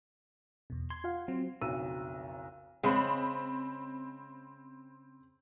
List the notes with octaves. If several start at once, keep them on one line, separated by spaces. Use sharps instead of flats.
E2 B2
C6 G#6
F4 F5 F#5
F#3 C4
F#1 B1 F2 F#4 E6 D#7
C#3 G#3 C4 B5